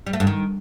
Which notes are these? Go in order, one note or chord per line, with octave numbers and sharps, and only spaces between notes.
G3
A3
G2
D#3